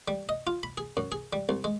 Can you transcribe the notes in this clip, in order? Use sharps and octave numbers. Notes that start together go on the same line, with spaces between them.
G3
D#5
F4
B5
G#4
F#2
G#4
G3
C2
G#3